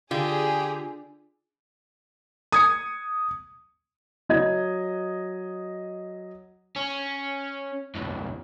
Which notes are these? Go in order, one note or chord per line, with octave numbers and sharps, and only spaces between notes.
D3 F4 G4 G#4
D#6 G#6 C#7
F#3 D#5 G#6
C#4
B1 F2